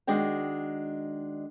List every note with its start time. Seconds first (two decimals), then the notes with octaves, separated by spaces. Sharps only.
0.07 D#3 G#3 D4 F#4 G5